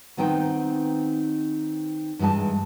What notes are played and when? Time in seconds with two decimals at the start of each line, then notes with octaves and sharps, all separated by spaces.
0.17 D#3 B3 C4 D#4 B4 G5
2.19 G2 E3 G#3 G#5 A5